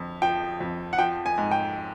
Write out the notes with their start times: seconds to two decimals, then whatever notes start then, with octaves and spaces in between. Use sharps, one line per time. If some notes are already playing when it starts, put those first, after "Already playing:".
Already playing: F2 D3
0.22 F3 G5
0.60 F2
0.93 F#5
0.98 F3 G5
1.26 G#5
1.38 G#2
1.51 G5